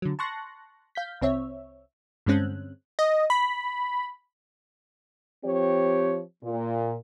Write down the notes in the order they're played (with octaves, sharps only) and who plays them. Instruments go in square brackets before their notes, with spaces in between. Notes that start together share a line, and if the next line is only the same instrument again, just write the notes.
[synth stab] D3 F#3
A5 C6 C#6 F#6 A#6
F5 G6 B6
C2 C4 C#5 E5
G2 D3 G#3 C4 C#4 F#6
[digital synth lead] D#5
B5
[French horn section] F3 C4 G4 C#5
A#2